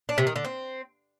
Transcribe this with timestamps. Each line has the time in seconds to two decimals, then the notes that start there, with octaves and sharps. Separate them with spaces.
0.09 D4
0.18 C3
0.27 D#3
0.36 D3
0.45 C4